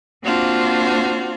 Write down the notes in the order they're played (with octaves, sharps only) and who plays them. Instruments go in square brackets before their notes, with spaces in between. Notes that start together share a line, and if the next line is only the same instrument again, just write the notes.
[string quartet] A#3 C4 D4 F4 F#4 C5